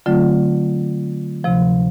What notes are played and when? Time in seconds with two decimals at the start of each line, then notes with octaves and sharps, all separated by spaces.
0.06 D3 F#3 A3 C4 F4
1.44 D2 C3 F3